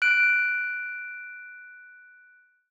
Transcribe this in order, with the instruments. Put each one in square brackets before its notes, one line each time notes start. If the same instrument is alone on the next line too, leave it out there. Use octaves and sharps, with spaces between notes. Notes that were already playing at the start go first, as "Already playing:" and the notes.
[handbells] F#6 D7